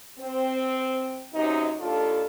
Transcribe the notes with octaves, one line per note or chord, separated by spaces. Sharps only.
C4
F#2 C3 D#4
D#2 D4 F4 A4